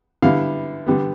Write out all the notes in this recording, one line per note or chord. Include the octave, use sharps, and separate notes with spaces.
D3 G3 B3 E4 F5
D3 G3 B3